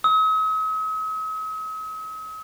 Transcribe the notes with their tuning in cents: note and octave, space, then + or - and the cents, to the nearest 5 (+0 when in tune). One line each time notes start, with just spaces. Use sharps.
D#6 +45